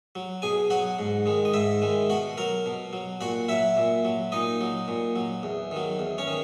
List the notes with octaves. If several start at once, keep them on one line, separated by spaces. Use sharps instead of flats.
F#3
B2 G#4 G#5
F#3 F#4 F#5
G#2
D#3 G#3
D#5
G#2 E4 E5
D#3 G#3
B2 F#4 F#5
F#3 A#4 A#5
B2
F#3
A#2 F#4 F#5
F#3 E4 E5
A#2
F#3
A#2 D#4 D#5
F#3
A#2
F#3
E2
D#3 F#3
E2
C#4 C#5
D#3